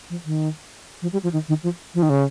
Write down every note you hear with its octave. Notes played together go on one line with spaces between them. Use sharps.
F3
D#3
F3
G3
F3
D#3
D#3
F3
F3
D#3
C#3